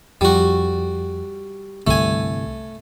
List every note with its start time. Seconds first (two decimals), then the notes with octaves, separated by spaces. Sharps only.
0.21 F2 G3 F#4
1.87 C2 G2 D3 A3 G#5